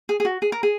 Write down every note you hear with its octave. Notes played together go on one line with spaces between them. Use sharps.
G#4
G#4
F#4
G#4
A#4
G#4